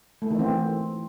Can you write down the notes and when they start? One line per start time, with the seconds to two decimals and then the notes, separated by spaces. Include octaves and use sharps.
0.22 A3
0.26 E4
0.31 D#3
0.35 E3
0.39 C4